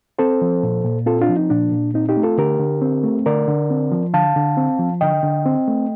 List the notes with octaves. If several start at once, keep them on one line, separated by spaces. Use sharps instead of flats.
C4 A4 C5
F3
A#2
A#2
C4 F4 A4
D4 F4
F3
D#4
A#2 D4
A#2
C4 D#4
D#4 G4
A3
F4 A4
D3 G4 A#4
D3
C4
A3
D3 A#4 D5
D3
C4
F3
D3 F5 A5
D3
C4
F3
D3 D#5 G5
D3
C4
A3